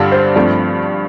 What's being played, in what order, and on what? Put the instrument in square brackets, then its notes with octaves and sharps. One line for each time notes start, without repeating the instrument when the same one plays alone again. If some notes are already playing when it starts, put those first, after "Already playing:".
Already playing: [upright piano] G2 D3 G3 D4 F4 [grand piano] D5
[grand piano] C5
[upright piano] G2 F3 A3 C4 [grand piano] D5